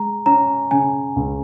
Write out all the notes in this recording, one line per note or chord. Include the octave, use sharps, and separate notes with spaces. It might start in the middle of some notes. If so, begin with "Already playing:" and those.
Already playing: G#3 A#5
C#4 A#5
C#3 G#5
C#2